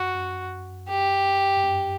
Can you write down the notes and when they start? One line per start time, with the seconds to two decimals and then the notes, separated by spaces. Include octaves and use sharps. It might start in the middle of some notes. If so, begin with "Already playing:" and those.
Already playing: F#2 F#4
0.15 F#2
0.89 G4
1.57 G2
1.63 F#2